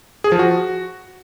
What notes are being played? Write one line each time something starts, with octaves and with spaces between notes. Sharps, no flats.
G#4
F3
F#4